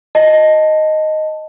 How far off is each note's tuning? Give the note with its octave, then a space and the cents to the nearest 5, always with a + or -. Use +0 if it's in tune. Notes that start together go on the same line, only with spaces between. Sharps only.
D#5 +0 A5 +0